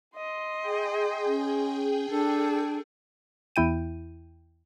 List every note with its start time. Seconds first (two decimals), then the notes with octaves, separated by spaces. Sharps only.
0.16 D#5 C6
0.62 G#4 G5
1.26 C#4
2.10 D4 A4
3.56 E2 E4 G5 D#7